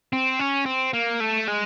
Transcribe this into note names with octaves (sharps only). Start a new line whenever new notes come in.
C4
C#4
C4
A#3
A3
G#3